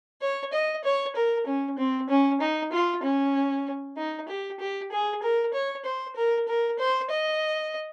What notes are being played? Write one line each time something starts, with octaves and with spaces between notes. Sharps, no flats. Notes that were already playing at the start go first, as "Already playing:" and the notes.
C#5
D#5
C#5
A#4
C#4
C4
C#4
D#4
F4
C#4
D#4
G4
G4
G#4
A#4
C#5
C5
A#4
A#4
C5
D#5